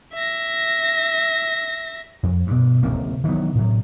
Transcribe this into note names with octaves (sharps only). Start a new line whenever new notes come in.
E5 A#6
F2
G2 B2
D1 F#2 C3 A#3
D#3 E3 F#3 B3
A2 C3 F#3